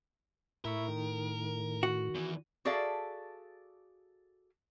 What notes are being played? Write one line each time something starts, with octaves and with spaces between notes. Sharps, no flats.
A2 E4 A#4 E5 C#6
D#3
F#4
E2 E3
F#4 G#4 A4 D5 E5 F5